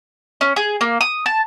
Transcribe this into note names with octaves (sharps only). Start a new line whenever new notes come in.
C#4
G#4
A#3
D#6
A5